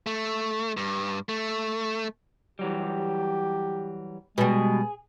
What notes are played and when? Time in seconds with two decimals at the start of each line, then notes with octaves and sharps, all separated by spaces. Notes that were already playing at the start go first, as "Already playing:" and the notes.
0.06 A3
0.77 G2
1.29 A3
2.59 E3 F#3 G3 G4
4.38 B2 G3 G#3 G#4